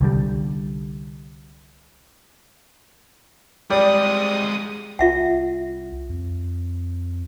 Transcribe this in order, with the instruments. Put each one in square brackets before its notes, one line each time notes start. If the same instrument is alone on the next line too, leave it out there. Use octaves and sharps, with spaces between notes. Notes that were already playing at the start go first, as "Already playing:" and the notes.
[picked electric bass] C2 D3 G3
[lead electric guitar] F2 G#3 [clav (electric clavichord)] G3 [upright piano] D5 [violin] D#6
[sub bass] C2 [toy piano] F4 E5 F#5
[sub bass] F2